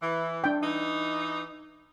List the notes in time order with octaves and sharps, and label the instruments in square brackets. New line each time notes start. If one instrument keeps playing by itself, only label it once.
[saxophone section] E3
[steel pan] D4 G5
[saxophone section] E3 D#4